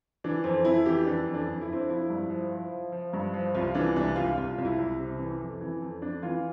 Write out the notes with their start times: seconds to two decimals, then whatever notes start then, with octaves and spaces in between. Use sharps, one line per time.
0.24 E3 D4
0.44 F2 C4
0.65 F2 E4
0.86 E3 G4
1.06 E3 D4
1.27 F2
1.34 D4
1.48 F2
1.61 E4
1.69 F2 C4
1.81 D4
1.89 F3 E4
2.10 G2
2.30 F3
2.52 F3
2.72 F3
2.92 F3
3.13 G2
3.34 F3
3.55 C2 F4
3.74 E3 D4
3.96 C2 D4
4.16 C2 F4
4.37 C2 F4
4.58 C2
4.65 E4
4.78 C2
4.99 C3
5.19 E3
5.40 F2
5.61 E3
5.82 F2
6.02 F2 D4
6.23 E3 F4